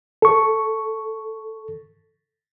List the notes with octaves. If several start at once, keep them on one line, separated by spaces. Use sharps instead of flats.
A4 C#6